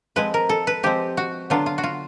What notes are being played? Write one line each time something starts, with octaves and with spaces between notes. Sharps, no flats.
F3 G#3 C4 B4
A#4
A4
B4
F3 G#3 C4 G4
F#4
D3 F#3 B3 D4 F4
F4
F#4
F4